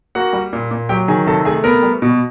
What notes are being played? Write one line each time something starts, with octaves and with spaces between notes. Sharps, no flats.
A#3 F#4 F#5
G3
A#2
A#2
F#3 G4 G5
D#3 G#4 G#5
C3 A4 A5
A3 G#4 G#5
B3 A#4 A#5
G3
B2